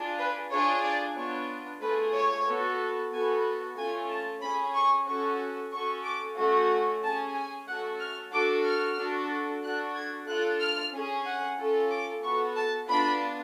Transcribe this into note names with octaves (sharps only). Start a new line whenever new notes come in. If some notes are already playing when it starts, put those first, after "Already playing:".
Already playing: D4 F4 G#4
B4
D4 F4 G#4 C#5
D5
B3 D4 F4 C#5
A3 F4 G#4 B4
C#5
B3 F#4 A4
B3 F#4 A4 G#5
A3 C#4 F4 G#5
A5
C#4 G#4 B5
C#6
C#4 F#4 A4 C#6
C#4 F#4 A4 C#6
D6
A3 C#4 F#4
C#4 G#4 A5
G#5
A3 C#4 F#4 A4 F#5
F6
D4 F#4 A4 D6
F6
D4 F#4 A4
D4 F#4 A4 F#6
G#6
D4 F4 A4 F#6
F6
C#4 G#4
F#5
C#4 F4 A4
D6
B3 F#4 A4 C#6
A5
B3 D4 F4 B5